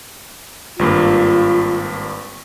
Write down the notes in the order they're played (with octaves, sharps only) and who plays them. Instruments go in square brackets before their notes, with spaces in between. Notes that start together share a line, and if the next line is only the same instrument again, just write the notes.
[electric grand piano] G#1 G2 A#3 [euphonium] F4